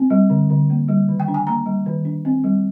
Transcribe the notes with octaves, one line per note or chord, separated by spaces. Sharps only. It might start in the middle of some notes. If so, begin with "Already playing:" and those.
Already playing: C4
G3
D3
D3
A#3
G3
D#3
G5
D4
G#5
A#3 A#5
G3
D#3
D4
C4
G3